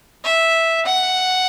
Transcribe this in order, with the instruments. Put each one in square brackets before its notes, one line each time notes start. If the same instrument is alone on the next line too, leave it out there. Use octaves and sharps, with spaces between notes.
[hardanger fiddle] E5
F#5